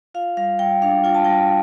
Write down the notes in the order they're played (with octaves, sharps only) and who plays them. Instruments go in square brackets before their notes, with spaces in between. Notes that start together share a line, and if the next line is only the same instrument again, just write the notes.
[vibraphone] F4 F5
G3 F5
G3 G5
D4 F5
F4 G5
A5
G3 G5